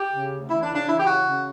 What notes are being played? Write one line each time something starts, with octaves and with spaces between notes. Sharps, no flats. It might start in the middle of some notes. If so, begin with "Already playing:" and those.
Already playing: G4
C#3
D2
E3 E4
D4
C#3
D4
E3 E4
G4
C#3 F#4
C#3